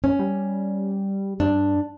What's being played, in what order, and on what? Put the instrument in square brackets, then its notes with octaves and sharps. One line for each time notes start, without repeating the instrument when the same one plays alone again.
[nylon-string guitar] C#4
[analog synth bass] G3
[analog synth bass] G2 [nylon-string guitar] D4